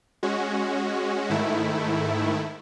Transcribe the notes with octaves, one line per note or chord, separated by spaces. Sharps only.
G#3 C#4 F#4
G#2 D#3 A3 E4